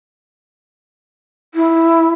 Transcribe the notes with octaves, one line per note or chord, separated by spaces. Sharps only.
E4